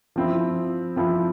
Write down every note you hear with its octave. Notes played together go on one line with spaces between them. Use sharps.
F3 C4 E4
F3 C4 E4